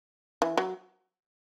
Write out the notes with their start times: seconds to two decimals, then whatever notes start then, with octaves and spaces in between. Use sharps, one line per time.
0.42 E3
0.57 F#3